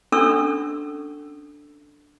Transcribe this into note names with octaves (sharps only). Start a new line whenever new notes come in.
C#4 D4 A4 C#6 E6